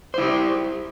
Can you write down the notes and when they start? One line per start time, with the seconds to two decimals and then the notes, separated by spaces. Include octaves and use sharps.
0.14 C5
0.18 E4
0.22 G4